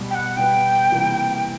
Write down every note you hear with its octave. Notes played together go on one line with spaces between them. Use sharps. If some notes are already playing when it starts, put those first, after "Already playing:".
Already playing: B2 G3 B3
G5
F#5
B2 G3 B3 G5
C3 E3 G3 A#3